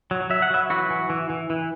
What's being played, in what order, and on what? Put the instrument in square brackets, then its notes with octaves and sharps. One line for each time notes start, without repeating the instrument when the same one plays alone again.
[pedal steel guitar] F#3
F#3 E5
F#5
F#3 B4 E5
E3 F#4 B4
E3
E3
E3
E3